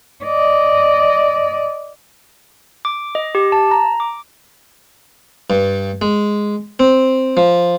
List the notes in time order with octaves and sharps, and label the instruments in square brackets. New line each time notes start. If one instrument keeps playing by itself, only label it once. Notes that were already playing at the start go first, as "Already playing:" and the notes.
[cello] D5 D#5
[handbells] D6
D#5
G4
A5
A#5
D6
[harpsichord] G2
G#3
C4
F3